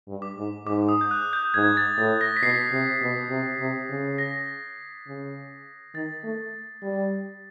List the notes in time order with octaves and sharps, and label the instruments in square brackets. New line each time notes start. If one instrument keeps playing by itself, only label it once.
[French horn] G2
[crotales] D6
[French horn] G#2
[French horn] G#2 [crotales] D6
[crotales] D#6
G6
F#6
G6
[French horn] G#2 [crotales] G#6
[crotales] A6
[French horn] A2 [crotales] A6
[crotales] A#6
B6
[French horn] B2 [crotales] C7
[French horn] C3
B2
C3
C3
C#3
[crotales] A#6
[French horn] C#3
[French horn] D#3 [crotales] A6
[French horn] A3
G3